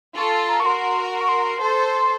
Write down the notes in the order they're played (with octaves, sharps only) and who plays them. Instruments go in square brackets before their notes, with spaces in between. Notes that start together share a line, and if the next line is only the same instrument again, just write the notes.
[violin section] F4 A4 [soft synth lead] C#6
[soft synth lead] C6
A#5
C#6
[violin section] F#4 A#4 [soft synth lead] C6
[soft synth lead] C6
C#6
C6
[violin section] A4 C5